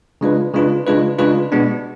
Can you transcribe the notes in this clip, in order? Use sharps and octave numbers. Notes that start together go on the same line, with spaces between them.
C#3 G#3 D4 F4 B4
C#3 G#3 D4 F4 B4
C#3 G#3 D4 F4 B4
C#3 G#3 D4 F4 B4
B2 G#3 B3 D4